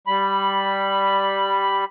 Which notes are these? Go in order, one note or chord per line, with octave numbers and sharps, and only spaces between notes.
G3 B5